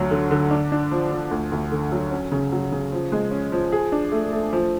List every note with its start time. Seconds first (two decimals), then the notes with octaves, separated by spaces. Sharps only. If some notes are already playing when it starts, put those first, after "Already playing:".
Already playing: D2 F#3
0.11 D3
0.31 D3
0.51 D4
0.72 D4
0.91 F3
1.11 F3
1.31 D2
1.52 D2
1.72 D3
1.92 F#3
2.11 C#4
2.32 C#3
2.52 F#3
2.72 C#3
2.92 F3
3.12 G#3
3.31 C#4
3.52 F3
3.72 G#4
3.92 D4
4.12 A3
4.32 A3
4.53 F3